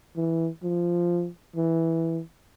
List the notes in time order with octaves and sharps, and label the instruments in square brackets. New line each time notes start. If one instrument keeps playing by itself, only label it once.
[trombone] E3
F3
E3